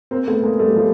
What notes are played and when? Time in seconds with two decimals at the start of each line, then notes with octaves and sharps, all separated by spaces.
0.11 A#3 C4
0.27 A3 B3
0.43 G#3 A#3
0.59 G3 A3
0.75 F3 G3